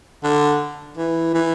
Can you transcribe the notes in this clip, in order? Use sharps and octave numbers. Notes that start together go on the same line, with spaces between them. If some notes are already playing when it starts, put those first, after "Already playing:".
D3
E3
E3